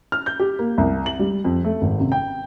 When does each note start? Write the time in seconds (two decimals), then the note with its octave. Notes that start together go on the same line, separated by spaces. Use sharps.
0.12 F6
0.26 G6
0.40 G4
0.59 A#3
0.78 C2
1.06 F#7
1.19 G3
1.44 F2
1.65 A3
1.81 G#1
2.00 C3
2.12 G5